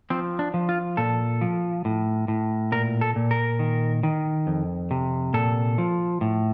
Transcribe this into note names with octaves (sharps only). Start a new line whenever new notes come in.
F3 C4
D4
F3
F4
A#2 A4
F3
A2
A2
A#2 A#4
A4
A#2
A#4
D#3
D#3
F2
C3
A#2 A4
F3
A2